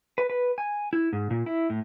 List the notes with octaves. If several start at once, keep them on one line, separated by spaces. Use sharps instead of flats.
B4
B4
G#5
E4
G#2
A#2
E4
A2